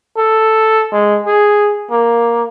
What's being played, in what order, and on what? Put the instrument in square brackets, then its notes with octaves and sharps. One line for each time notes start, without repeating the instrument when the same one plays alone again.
[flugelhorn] A4
G#3
G#4
A#3